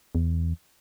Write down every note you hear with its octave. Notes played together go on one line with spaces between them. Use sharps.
E2